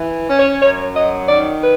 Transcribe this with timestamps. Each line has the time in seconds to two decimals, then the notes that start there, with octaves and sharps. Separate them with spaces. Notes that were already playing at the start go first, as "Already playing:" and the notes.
Already playing: E3
0.27 C#4
0.38 C#5
0.60 F#2 C#5
0.95 F#3 D#5
1.28 D#3 D5
1.61 B4